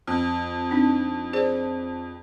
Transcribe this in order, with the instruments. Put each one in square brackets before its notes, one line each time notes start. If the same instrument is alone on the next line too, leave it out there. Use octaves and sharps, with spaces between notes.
[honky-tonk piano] F2
[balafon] C4 D4 D#4
G#4 C5 D5